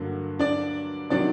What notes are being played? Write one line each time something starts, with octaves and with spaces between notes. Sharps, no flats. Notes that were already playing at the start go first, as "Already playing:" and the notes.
Already playing: G2 D3 F#3 A#3
D4 D5
C3 D#3 F#3 D4 D5